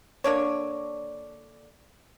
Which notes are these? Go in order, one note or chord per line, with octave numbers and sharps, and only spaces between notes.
D3 A#3 D4 C#5